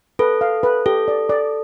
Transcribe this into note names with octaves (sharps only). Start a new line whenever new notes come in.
A4 B4
F5
B4
G4 A4
D5
D5